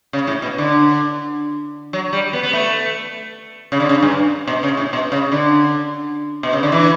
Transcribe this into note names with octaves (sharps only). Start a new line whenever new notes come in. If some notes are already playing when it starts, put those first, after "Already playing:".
C#3
A2
B2
D3
F#3
G3
B3
B3
A3
C#3
D3
C#3
G2
B2
C#3
A2
B2
C#3
D3
B2
C#3
D3
E3